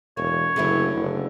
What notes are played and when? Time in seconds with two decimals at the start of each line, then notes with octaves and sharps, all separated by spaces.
0.17 E1 A#3 C#5
0.56 F#1 D3 A3 E4
0.95 F#1